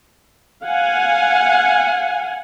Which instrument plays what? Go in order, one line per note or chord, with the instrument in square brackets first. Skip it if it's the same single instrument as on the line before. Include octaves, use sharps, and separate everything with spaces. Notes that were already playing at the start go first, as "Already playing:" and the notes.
[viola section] F5 F#5 G#5